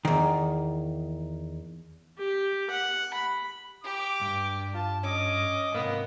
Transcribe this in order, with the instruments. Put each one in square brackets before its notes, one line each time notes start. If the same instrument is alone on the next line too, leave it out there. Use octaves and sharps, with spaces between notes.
[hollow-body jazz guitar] E2 D#3
[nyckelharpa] G4
F#5
B5
[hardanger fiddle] G4 [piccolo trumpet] D6
[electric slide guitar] G2
[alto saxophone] F4 [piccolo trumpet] A5
[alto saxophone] C#4 [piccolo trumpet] D#5 [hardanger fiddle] D6
[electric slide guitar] G#2 C3 [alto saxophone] A#3 [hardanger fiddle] B3